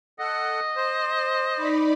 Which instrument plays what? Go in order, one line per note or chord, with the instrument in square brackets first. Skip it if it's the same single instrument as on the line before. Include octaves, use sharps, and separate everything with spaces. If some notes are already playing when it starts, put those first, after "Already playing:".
[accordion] A4 F#5 [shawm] D#5
[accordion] C5
[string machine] D#4 D5 B5